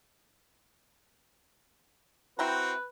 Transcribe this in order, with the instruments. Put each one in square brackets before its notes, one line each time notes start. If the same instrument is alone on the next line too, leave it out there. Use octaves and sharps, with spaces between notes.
[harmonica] C4 F#4 C5 [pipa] E4 G5 A#5 [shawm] B4